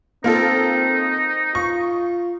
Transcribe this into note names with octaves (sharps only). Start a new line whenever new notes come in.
A#3 C4 D#4 F4 A4
F4 C#6